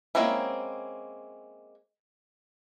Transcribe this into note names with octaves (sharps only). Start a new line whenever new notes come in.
G#3 A#3 C4 C#4 E4